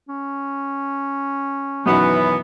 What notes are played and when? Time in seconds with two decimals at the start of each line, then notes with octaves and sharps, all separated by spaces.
0.08 C#4
1.86 F#2 B2 D#3 E3 B3